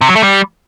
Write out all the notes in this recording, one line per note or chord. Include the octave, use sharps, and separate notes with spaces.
C3
F#3
A3
G3